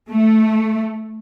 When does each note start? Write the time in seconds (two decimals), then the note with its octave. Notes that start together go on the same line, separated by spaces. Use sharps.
0.10 A3